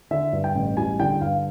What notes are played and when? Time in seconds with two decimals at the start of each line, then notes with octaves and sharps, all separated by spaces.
0.11 D3 E5
0.33 G2
0.44 G5
0.55 A1
0.77 G3 G#5
0.99 D3 G5
1.21 G2 F5